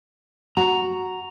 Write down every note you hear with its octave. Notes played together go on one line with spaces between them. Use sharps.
F#4 A#5